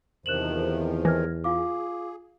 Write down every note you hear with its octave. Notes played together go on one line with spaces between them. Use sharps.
E2 C3 D#3 F3 F#6 E7 F#7
E3 F6 G#6 A#6
F4 G#4 F5 D6